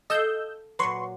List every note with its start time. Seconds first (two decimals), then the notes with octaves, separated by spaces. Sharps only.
0.10 A4 D#5 F5 E6 G6
0.79 A#2 F#3 B4 C6 C#6